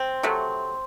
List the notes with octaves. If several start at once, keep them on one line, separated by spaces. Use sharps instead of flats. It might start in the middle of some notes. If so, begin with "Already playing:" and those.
Already playing: C4
C3 F#3 A3